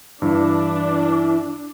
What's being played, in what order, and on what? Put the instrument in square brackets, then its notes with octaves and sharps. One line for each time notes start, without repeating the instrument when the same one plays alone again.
[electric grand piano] G2 [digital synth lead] E3 [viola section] D4